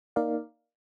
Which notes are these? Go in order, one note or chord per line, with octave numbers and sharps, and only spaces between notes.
A#3 D#4 A#4 D5 F5